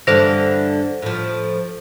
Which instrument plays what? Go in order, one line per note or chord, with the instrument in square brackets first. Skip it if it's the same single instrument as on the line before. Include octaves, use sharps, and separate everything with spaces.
[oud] G2 D3 E3 [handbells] C5 A#6
[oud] A2 F3